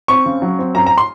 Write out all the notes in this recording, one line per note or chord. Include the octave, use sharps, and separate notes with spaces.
C4 C#6
C#3
F#3
C4
F#2 A#5
A#5
C6